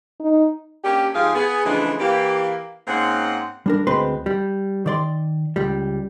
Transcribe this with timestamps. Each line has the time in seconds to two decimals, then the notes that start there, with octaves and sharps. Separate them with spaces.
0.20 D#4
0.84 A#3 C#4 D4 G4
1.14 G#2 F3 G4 G#4 F5
1.35 B3 G#4
1.65 C#3 E3 F3 G#3 A3 D4
1.99 E3 A#3 G4
2.88 G#2 A#3 C4 C#4 F#5
3.66 G3 D4 A#4
3.87 D2 G#3 C4 B4 C6
4.26 G3
4.86 D#3 D5 C6
5.56 C#2 G3